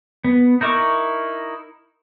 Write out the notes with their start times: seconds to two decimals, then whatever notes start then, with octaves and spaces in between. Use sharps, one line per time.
0.24 B3
0.61 D#4 E4 A#4 C#6 D6